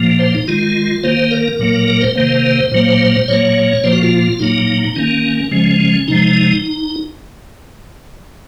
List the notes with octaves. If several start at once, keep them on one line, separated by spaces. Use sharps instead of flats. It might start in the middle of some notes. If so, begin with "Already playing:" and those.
Already playing: A#2 F3 A#3
C5
D#4
D#3 G#3 F4
D#3 A#3 C5
A#4
A#2 F#3 A#3
A#4
C5
C3 D#3 A#3 C5
A#2 F#3 A#3
A#2 F#3 A#3 C#5
A#2 F3 A#3 C5
F#4
F4
A#2 F#3 A#3 D#4
D#3 A#3 C#4
C#3 F3 G#3 C#4
C#4
C3 F3 G#3 D#4